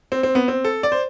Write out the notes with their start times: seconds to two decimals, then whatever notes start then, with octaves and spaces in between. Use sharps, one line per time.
0.12 C4
0.23 C4
0.35 B3
0.48 C4
0.65 A4
0.83 D5
0.92 C5